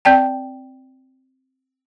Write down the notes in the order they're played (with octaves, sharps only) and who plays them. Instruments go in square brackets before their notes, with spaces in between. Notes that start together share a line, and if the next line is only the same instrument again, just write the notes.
[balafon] C4 D5 G5 A5